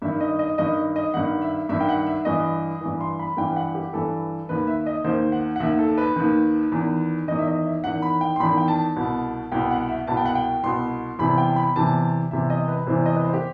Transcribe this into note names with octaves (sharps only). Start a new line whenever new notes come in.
G2 D#3 E5
D#5
D#5
G2 D#3 D#5
D#5
G2 D#3 F#5
E5
G2 D#3 E5
G5
F#5
E5
G2 E3 D#5
G2 E3
C6
B5
G2 E3 G5
F#5
G4
G2 E3 A4
D#2 D#3 B4
E5
D#5
D#2 D#3 C5
F#5
F#5
D#2 D#3 E5
A4
B4
D#2 D#3
E2 D#3
E2 D#3 D#5
E5
D#5
E5
E2 D#3 F#5
B5
G5
C6
E2 D#3 B5
G5
A5
C2 B2
C2 B2 G5
F#5
E5
C2 B2 A5
G5
F#5
G5
C2 B2 C6
E2 C3 E3 B5
G5
B5
E2 C3 E3 A5
E2 C3 E3 E5
D#5
B4
E2 C3 E3 C5
D#5
B4
C5
G4